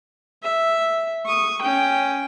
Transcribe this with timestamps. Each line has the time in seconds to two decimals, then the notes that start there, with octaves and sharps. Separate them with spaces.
0.42 E5
1.26 C#6 D#6
1.62 C#4 G5